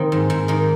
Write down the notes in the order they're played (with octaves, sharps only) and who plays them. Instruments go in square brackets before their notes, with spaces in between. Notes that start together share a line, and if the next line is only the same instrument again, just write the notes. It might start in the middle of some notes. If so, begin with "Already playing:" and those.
Already playing: [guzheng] D#3 A#3 C4
G#2
G#2
D#3 A#3